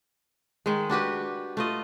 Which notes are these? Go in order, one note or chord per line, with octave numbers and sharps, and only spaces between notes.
D#3 G#3
D4 F#4 G4 B4
A3 F4 D#5